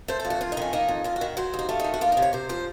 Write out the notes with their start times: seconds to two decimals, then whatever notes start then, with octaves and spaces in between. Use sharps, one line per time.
0.08 A3 C5
0.20 A4
0.25 F2
0.30 F#4
0.41 F2 F4
0.52 D#4
0.57 D#3 C#4
0.73 A#3 D#4
0.89 F2
1.04 F2 F4
1.16 F#4
1.21 D#3
1.37 F#3 C5
1.54 D#2
1.59 D#4
1.69 A3 F4
1.80 D#4
1.84 D#3
1.94 F#4
2.01 A#3 F4
2.12 D#4
2.17 C3
2.22 C#5
2.33 C3 C5
2.49 F3 C5